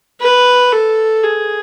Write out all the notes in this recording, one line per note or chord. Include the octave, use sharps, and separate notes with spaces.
B4
A4
G#4